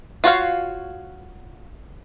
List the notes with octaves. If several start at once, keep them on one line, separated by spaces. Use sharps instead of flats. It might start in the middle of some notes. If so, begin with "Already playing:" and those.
F4 F#4 C#5 F5